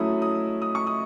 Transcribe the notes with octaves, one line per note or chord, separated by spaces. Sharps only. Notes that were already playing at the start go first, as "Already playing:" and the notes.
Already playing: F#3 A3 C#4 E4 D#6
D#6
D#6
C#6
D#6